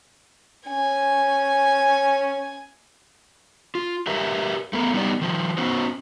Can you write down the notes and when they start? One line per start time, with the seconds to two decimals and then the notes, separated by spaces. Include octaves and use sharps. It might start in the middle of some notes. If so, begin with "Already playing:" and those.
0.67 C#4 G#5
3.75 F4
4.07 G4 A#4 B4 E5
4.73 A3 B3 A#4
4.94 G3 B3 D#4 G4 A#4 D5
5.21 D#3 F3
5.58 B3 C#4 D#4 F#4 C5